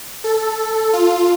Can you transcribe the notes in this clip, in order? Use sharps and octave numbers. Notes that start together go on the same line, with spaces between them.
A4
F4